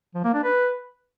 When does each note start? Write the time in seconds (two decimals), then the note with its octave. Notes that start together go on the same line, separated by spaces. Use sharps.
0.14 F3
0.24 A#3
0.34 D4
0.44 B4